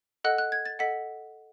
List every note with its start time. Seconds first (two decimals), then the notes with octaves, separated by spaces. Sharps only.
0.24 A4 D#5 F#5 F#6
0.38 F#6
0.52 G#6
0.65 A6
0.79 A4 D#5 F#5 B6